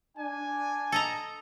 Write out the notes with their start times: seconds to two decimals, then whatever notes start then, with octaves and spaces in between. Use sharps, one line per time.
0.18 D4 G#5
0.92 A4 D#5 A#5